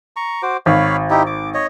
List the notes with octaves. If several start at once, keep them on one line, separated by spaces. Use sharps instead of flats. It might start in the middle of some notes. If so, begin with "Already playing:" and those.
A#5 C#6
F#4 C5 D6
G#1 C#5 F5 B5
D#4 E4 G4
D6
C#5 D#5